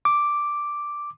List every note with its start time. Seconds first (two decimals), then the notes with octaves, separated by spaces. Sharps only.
0.05 D6